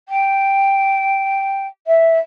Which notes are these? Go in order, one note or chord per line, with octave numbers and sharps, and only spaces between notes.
G5
E5